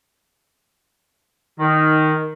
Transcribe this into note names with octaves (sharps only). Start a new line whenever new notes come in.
D#3